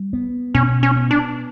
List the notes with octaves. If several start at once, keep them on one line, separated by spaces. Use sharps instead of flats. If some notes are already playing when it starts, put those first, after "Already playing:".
Already playing: G3
B3
B2 C#4
C#4
B3
D4